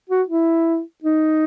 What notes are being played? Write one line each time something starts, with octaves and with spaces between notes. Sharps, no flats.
F#4
E4
D#4